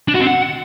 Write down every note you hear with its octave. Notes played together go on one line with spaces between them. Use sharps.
D4
F#4
C4
F#5